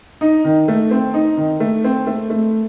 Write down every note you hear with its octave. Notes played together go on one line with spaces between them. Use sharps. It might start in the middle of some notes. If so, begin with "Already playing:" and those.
D#4
D#3
A3
C4
D#4
D#3
A3
C4
A3
A3